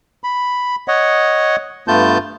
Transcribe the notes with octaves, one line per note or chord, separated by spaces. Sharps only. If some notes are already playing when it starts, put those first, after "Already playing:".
B5
C#5 D#5 F#5
G2 A3 B3 F4 A5 G6